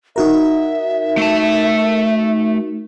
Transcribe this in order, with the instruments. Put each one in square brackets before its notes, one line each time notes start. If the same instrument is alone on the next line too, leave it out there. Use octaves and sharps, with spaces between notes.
[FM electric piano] D#4 F#4 A#4 [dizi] E5
[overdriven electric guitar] A3 A5